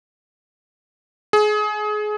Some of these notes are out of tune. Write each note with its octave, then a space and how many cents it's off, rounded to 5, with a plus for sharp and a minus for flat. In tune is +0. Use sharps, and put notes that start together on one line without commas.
G#4 +25